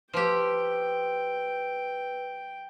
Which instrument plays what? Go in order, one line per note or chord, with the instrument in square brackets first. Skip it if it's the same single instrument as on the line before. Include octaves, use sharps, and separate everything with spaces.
[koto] F3 G4 [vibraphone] B4 E6 [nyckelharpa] G5